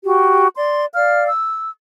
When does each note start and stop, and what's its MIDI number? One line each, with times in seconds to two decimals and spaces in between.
0.05 0.48 66
0.05 0.48 67
0.56 0.85 74
0.56 0.85 84
0.94 1.27 74
0.94 1.27 77
0.94 1.27 89
1.27 1.68 88